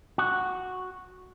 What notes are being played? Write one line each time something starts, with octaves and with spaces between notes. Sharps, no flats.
F#4